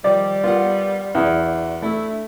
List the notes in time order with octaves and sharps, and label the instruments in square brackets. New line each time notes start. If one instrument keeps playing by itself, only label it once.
[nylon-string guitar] D#3 F3 [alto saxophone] G3 [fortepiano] D5
[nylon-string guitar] B3 A#4 F#5 [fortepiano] F4
[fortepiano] E2 [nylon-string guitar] D4 F#4
[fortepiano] A3 [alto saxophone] E4